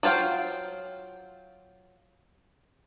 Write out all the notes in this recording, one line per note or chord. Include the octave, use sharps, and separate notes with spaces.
F#3 F4 C5 F5 G5